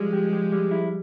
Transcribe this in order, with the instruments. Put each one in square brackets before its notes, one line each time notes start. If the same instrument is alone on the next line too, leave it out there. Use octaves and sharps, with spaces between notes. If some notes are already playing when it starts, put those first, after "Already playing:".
Already playing: [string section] F3 G#3 [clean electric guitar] G3
[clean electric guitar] G4
G4
G3
E4